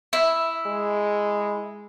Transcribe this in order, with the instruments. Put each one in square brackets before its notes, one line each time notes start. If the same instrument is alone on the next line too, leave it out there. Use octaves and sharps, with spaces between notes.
[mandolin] E4
[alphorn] G#3